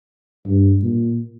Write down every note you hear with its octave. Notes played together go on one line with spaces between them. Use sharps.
G2
A#2